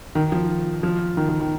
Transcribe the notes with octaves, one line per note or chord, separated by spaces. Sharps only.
D#3
F3
F3
D#3
D#3
D#3